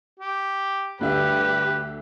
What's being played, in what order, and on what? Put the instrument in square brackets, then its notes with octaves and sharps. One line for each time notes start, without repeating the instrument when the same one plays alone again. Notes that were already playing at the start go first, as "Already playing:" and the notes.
[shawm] G4
[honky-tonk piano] D2 D3 E5 [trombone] G2 [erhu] G4 [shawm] B4